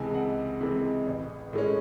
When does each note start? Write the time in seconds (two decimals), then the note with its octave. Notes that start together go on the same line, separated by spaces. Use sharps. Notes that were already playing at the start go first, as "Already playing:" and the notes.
Already playing: C#2 C3 E3 G#3 G#5 A5
0.14 C#2 F#5
0.61 C3 E3 G#3
1.07 A1
1.53 A2 G#3 C#4